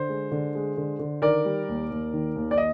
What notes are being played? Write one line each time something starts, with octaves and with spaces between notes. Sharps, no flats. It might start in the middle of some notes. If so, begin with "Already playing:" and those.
Already playing: D3 C5
G#3
D3
G#3
D3
D3
D#3 A#4 D5
G3
D#2
D#2
D#3
D#2
D5
D#5